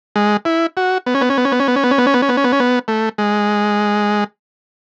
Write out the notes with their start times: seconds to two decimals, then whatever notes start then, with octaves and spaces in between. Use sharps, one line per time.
0.16 G#3
0.45 E4
0.77 F#4
1.06 B3
1.15 C#4
1.21 B3
1.30 C#4
1.38 B3
1.45 C#4
1.52 B3
1.60 C#4
1.68 B3
1.76 C#4
1.84 B3
1.91 C#4
1.98 B3
2.07 C#4
2.14 B3
2.22 C#4
2.29 B3
2.37 C#4
2.44 B3
2.52 C#4
2.60 B3
2.88 A3
3.18 G#3